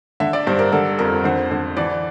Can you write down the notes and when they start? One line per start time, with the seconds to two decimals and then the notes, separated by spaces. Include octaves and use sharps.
0.20 D3 E5
0.33 D5
0.47 G2 C5
0.59 A#4
0.72 D3 A4
0.99 F2 A#4
1.24 D3 C5
1.51 D3
1.77 E3 D5